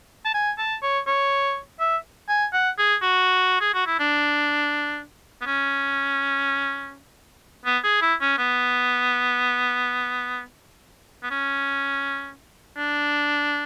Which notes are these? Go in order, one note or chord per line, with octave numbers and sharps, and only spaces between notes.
A5
G#5
A5
C#5
C#5
E5
G#5
F#5
G#4
F#4
G#4
F#4
E4
D4
B3
C#4
B3
G#4
E4
C#4
B3
B3
C#4
D4